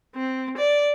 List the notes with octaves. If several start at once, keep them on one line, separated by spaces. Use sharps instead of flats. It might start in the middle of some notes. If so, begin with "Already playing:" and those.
C4
D5